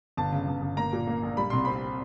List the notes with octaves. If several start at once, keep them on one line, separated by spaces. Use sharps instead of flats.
G1 A5
C#3
G1
G1
A#3 A#5
A#2
A#3
A#1
G3 B5
C2 C6
C4 B5